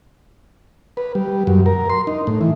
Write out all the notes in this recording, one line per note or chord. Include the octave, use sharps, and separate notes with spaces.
B4
G3
F#2
A#4
C6
D#4
A2
E3